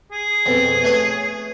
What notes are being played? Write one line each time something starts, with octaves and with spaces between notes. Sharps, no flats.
G#4
F2 B2
A3 B4 C#5